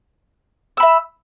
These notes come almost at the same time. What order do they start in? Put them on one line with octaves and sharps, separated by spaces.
E6 B5 E5